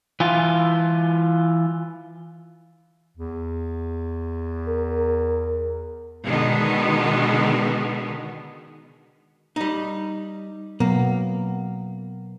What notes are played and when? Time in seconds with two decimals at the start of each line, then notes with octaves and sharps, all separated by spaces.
0.20 E3 F4
3.17 E2
4.68 A#4
6.26 B2 D3 D#3 G#3 B3
9.56 G3 D#4
10.80 B2 F#3 A#3 B3